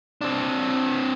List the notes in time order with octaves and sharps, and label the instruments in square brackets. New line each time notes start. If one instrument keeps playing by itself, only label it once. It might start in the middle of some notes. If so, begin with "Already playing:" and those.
[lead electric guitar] C4 D4